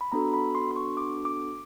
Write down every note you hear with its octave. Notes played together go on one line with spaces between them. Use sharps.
B5
B3 D4 F#4 A4 A#5
B5
C6
C6
C#6
D6
D6